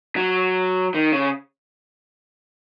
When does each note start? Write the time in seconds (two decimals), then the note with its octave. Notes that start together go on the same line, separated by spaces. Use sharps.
0.16 F#3
0.95 D#3
1.12 C#3